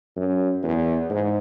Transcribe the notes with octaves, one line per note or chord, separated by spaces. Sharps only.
F#2
E2
G#2